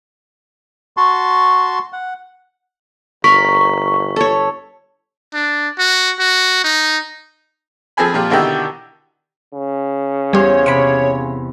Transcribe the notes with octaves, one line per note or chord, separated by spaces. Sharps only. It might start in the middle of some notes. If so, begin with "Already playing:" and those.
F#4 A5 C6 C#6
F#5
G1 A#4 C#6 B6
A4 C#5
D4
F#4
F#4
D#4
F3 C4 G#4 A4 G#5 B5
A#2 F3 F4 G4
B2 D3 D#3 E4 G4
C#3
E2 G3 G4 C5 C#5
C3 B5 C#7 D7